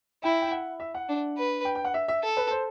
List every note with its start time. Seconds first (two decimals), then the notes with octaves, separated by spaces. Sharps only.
0.23 E4 G5
0.42 G5
0.51 F#5
0.80 E5
0.94 F#5
1.09 D4
1.37 B4
1.65 G5
1.75 G5
1.85 F#5
1.94 E5
2.08 E5
2.23 A4
2.37 B4
2.51 C5